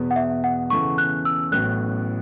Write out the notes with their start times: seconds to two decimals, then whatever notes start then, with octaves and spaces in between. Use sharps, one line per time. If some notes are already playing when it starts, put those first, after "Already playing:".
Already playing: E2 B2 B3
0.11 F#5
0.16 E5
0.44 F#5
0.70 C#3 E3 B3 A4 C#6
0.98 F#6
1.25 E6
1.52 A1 A2 F#3 B3 F#6